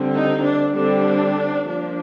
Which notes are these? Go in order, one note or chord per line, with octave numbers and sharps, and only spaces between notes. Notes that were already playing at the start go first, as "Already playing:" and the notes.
Already playing: D3 G3 C4
D#4
D4
D3 G3 C4 D4
F3 A#3 D4